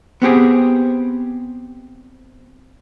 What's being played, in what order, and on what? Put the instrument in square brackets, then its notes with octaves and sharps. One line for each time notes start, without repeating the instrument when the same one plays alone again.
[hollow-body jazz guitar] B3 C4 G4 G#4